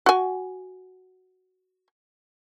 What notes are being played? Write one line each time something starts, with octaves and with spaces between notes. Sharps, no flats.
F#4 G#5